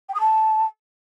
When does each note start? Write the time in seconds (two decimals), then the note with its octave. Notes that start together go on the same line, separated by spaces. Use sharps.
0.09 G5
0.15 D#6
0.20 A5